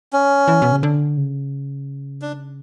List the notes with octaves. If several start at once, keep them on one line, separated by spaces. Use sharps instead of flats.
C#4
E3
B2
C#3
D3
C#3
D4